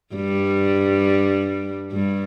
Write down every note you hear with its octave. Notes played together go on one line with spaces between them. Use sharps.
G2 G3
G2 G3